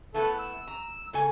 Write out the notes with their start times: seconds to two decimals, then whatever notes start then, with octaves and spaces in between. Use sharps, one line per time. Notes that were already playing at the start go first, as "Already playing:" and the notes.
0.14 A3 B3 E4 A4
0.39 E6
0.67 A#5
1.13 C#3 A4 G#5